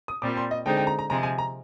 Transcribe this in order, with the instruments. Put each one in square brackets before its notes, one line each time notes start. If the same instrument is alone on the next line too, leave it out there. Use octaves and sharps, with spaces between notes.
[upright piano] D#6
[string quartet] A#2 G3 C4 [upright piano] D6
[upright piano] C6
D#5
[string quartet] D3 G#3 C4 D#4 [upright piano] G5
[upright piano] G5
A#5
A#5
[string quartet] C3 F3 G#3 C4 [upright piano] A#5
[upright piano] G#5
A#5